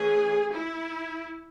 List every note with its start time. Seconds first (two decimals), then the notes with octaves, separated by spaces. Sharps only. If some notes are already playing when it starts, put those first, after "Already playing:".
Already playing: E3 A3 C#4 G#4
0.52 E4